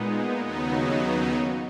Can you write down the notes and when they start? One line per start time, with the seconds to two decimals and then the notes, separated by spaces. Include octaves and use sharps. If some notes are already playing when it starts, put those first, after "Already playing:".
Already playing: A#2 G#3 B3 D#4
0.42 D#2 C#3 F#3 B3 D#4